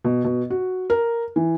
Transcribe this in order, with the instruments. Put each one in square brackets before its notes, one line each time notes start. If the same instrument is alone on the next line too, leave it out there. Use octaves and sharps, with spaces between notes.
[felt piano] B2
B2
F#4
A#4
E3